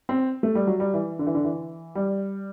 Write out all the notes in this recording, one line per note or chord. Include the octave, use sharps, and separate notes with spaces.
C4
A3
G3
F#3
G3
E3
D3
E3
D3
E3
G3